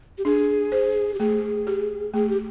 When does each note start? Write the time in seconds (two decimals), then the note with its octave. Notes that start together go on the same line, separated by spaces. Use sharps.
0.18 G4
0.25 D4 G#4
0.72 C5
1.14 G4
1.19 A3 G#4
1.67 G4
2.14 A3 G#4
2.29 G4